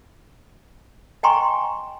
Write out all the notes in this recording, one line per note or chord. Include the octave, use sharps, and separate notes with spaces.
D#5 G5 G#5 A#5 C6 C#6